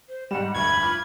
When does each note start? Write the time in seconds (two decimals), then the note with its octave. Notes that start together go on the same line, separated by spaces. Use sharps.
0.09 C5
0.31 G#2 G3 F#5 E7
0.55 F1 D2 G2 B5 G#6
0.83 F4 D6 F6